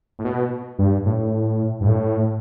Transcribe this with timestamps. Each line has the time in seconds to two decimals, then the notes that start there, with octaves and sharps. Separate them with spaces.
0.19 A2
0.25 B2
0.79 G2
1.06 A2
1.81 G2
1.88 A2